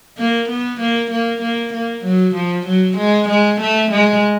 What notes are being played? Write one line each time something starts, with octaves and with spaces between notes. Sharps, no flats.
A#3
B3
A#3
A#3
A#3
A#3
F#3
F3
F#3
G#3
G#3
A3
G#3